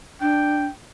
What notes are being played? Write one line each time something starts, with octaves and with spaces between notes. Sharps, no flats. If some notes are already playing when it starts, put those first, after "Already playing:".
D4 G5